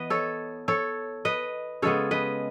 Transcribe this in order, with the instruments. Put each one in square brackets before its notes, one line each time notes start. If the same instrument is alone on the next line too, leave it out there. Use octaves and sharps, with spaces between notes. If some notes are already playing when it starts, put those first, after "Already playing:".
Already playing: [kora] E3 B3 B4 D#5
A4 C#5
A4 C#5
B4 D#5
C#3 G#3 B3 A4 C#5
B4 D#5